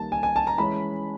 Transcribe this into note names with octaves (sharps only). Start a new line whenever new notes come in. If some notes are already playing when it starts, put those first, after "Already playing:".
Already playing: D#3 G3 A#3 A5
G#5
G#5
A5
A#5
E3 G#3 C#4 B5